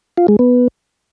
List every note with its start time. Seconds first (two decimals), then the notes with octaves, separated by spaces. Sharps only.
0.18 F4
0.28 G#3
0.39 B3